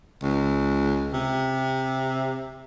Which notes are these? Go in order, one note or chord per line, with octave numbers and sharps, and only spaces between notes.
C#2
C3